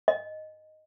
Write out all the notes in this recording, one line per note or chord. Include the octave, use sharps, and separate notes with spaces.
D#5